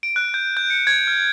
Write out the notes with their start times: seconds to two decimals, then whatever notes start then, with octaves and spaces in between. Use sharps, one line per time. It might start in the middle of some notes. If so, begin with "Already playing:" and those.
0.03 D7
0.16 F#6
0.34 G6
0.57 G6
0.70 C#7
0.87 G#6
1.08 F6